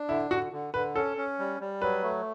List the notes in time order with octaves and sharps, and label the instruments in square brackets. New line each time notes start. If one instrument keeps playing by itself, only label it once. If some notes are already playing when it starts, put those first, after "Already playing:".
Already playing: [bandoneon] D4
[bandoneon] D3 [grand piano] E4
[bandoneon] D3 [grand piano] F#4
[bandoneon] D3
[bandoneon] D3 [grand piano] B4
[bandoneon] C#4 [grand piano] A4
[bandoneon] C#4
G3
G3
[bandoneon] F#3 [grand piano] B4
[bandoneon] A3